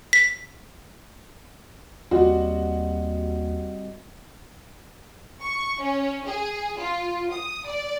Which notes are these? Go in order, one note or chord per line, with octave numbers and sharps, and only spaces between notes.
B6
D#2 G3 C4 F#4 D#5
C#6
C#4
G#4
F4
D#6
D5